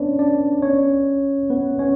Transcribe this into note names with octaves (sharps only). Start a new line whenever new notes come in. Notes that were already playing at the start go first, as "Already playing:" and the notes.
Already playing: B3 C#4 D4 B4 C#5 D5
D4 D5
C#4 C#5
B3 B4
C#4 C#5